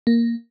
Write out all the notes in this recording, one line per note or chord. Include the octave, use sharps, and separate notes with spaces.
A#3